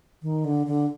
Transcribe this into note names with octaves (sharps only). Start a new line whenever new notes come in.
D#3
D3
D3